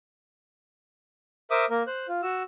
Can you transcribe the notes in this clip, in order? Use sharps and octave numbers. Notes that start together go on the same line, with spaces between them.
A#4 C5 E5 D6 D#6
A#3 A#4
C5 F#6
F4
F#4 E6